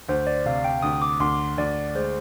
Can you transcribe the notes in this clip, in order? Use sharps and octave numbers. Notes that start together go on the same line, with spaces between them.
D2 C5
D5
C3 F5
G5
D2 D#6
D6
D2 C6
D2 D5
G#3 C5